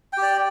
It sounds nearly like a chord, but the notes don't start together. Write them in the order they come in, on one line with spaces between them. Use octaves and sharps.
G5 G4 D5